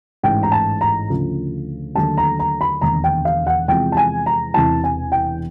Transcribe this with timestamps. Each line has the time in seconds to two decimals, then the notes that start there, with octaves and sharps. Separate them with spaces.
0.23 A1 G#2 E3 G#3 G5
0.43 A#5
0.52 A5
0.81 A#5
1.09 D2 C#3 F3
1.95 D#2 D3 F#3 A3 A5
2.18 A#5
2.39 A#5
2.61 B5
2.81 E1 D#2 D3 A#5
3.04 G5
3.25 F5
3.47 F#5
3.68 E2 C3 F3 G#3 G5
3.92 A5
3.97 G#5
4.26 A#5
4.54 E1 E2 C3 E3 A5
4.84 G#5
5.12 G5